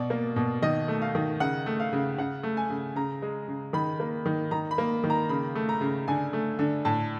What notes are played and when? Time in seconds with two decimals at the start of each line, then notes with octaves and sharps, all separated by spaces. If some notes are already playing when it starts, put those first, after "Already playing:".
Already playing: B2 D5
0.10 A#3
0.36 B2
0.62 D#3 D#5
0.88 A3
1.02 F5
1.15 D#3
1.40 C#3 F#5
1.66 A3
1.80 F5
1.93 C#3
2.18 C#3 F#5
2.43 A3
2.57 G#5
2.70 C#3
2.96 C#3 A#5
3.22 G#3
3.48 C#3
3.73 D#3 B5
4.00 A#3
4.26 D#3
4.51 D#3 A#5
4.71 B5
4.78 A#3
5.04 D#3
5.10 A#5
5.29 C#3 B5
5.55 A3
5.69 A#5
5.81 C#3
6.08 D3 G#5
6.33 A3
6.59 D3
6.85 A2 A5